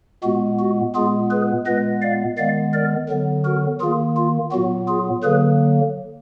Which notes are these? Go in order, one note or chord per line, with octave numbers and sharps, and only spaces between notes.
A#2 G#3 B3 F#4
F#4
A#2 G#3 B3 F4 G#4
G#4 B4
A#2 G#3 B3 B4 D#5
D5 F5
D#3 G#3 B3 D5 F5
A#4 D5
D3 F#3 B3
F#4 A#4
D#3 A#3 F4 G#4
F4
A#2 F#3 B3 F#4
F4 G#4
D3 F#3 A#3 G#4 B4